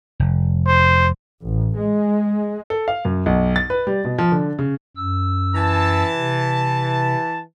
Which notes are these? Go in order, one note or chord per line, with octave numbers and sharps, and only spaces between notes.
F1
C5
A1
G#3
A4
F5
F#2
B1
A6
B4
G3
B2
F3
D3
C#3
F#2 E6
E3 A5
C3